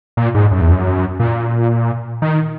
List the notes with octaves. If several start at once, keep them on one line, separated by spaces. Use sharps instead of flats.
A#2
G#2
F#2
E2
F#2
A#2
D#3